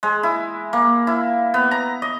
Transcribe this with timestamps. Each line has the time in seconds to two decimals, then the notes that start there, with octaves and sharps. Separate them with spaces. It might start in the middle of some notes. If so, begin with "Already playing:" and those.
0.03 G#3
0.23 E4
0.73 A#3
1.07 E4
1.54 B3
1.71 A#5
2.02 D#5